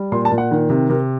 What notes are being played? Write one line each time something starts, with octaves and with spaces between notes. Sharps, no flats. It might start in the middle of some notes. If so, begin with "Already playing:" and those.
Already playing: G3
A#2 C6
A5
A#2
F#5
D#3
C3
C3 A#4